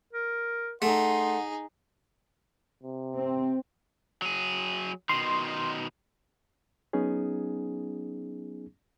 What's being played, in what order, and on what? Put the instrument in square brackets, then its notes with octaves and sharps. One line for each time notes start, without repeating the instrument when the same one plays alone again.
[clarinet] A#4
[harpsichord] A3 [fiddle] D#4 G#4 [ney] F#5 [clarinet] C6
[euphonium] C3
[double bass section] C4
[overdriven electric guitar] F#3 G#4
[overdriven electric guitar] B2 D#3 [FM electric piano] C6
[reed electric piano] F#3 B3 C#4 D#4 G#4